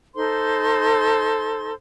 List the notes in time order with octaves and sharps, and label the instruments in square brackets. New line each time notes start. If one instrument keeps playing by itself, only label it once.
[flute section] D#4 A4 C5 C6